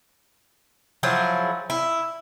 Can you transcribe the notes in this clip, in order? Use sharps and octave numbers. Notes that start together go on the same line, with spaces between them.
F3 F#3 E4 G#4
E4